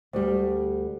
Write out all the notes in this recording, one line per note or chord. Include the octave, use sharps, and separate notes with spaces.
D2 G3